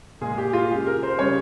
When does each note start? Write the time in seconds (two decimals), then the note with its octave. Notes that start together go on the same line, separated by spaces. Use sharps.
0.21 A#2 G#3 G#4
0.38 G4
0.53 F4
0.69 C#3 G#3 G4
0.87 A#4
1.03 C5
1.19 C#3 G3 C#5